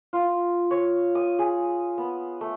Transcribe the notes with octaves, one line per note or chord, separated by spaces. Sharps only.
F4
C#5
D#6
G#4
B3
A3